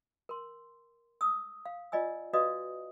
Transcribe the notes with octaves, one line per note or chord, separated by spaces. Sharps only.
A#4 C6
D#6 E6
F5
F4 D5 D#5 G#5 E6
F#4 B4 D5 D#5 F5 D#6